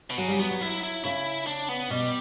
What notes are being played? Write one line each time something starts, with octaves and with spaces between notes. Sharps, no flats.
B2
C#3 F#3
G3
F#3 B3
F#3
F#3 E4
E4
C#3 E4
D4
B3
B2 G3